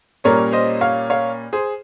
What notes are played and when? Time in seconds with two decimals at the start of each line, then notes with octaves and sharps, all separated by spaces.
0.24 A#2 G3 A#3 C#4 A#4 C#5
0.53 C5 D#5
0.81 C#5 F5
1.10 C#5 F5
1.53 G#4 C5